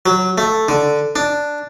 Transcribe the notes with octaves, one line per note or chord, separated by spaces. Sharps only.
F#3
A3
D3
D4